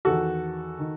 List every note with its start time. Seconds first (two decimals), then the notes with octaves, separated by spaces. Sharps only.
0.05 E2 D#3 F#4 A4
0.79 D#3